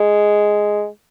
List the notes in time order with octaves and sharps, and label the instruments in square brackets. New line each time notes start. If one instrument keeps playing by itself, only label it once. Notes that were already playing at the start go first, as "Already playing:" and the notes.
Already playing: [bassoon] G#3